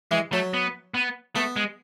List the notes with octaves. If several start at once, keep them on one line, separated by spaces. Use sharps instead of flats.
E3 G#3
F#3 A3
B3
B3
A3 B3
G#3